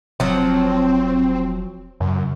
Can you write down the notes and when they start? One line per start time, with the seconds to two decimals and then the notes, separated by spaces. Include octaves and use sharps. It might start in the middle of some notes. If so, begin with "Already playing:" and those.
0.20 E1 F3 F#3 C4
2.00 F#2 C#3